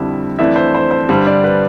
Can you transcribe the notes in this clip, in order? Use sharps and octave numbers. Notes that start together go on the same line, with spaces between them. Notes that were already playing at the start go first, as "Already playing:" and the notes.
Already playing: F2 D3 G3 E4 E5
F2 E3 A3 D4 E4 E5
C5
C5
C5
G2 D3 G3 C5
D4 D5
B4